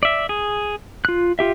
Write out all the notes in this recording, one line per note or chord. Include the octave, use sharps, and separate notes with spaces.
D5 E5
G#4
F4 F#6
F4 G4 E5